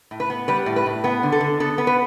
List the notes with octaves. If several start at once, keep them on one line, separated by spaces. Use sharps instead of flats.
A2
B4
B3
G3 B4
A2
B4
A2
B3 B4
D3
A4
D3
B3 A4
B3
B4